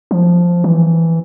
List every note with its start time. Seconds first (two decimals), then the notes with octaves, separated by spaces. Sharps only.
0.11 F3
0.64 E3